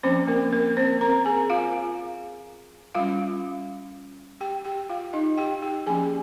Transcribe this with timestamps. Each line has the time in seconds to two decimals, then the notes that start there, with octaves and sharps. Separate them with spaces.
0.03 F3 A#3 C4 C#4 C5
0.27 A#3 A#4
0.52 A#3 A#4
0.77 C4 C5
1.01 A#4 A#5
1.25 G#4 G#5
1.50 F4 F5
2.95 G3 C#4 F4 F5
4.41 G4 G5
4.65 G4 G5
4.89 F4 F5
5.13 D#4 D#5
5.38 G4 G5
5.63 G4 G5
5.86 F3 A#3 C#4 G#4 G#5